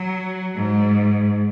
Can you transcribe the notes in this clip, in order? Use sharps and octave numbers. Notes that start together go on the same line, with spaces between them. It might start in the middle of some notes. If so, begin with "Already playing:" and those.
Already playing: F#3
G#2